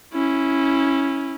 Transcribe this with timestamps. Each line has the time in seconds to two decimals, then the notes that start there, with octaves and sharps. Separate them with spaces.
0.14 C#4 E4